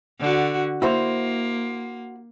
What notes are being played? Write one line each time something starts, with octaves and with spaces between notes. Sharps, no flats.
D3 F#4
A#3 E4 F#4 C5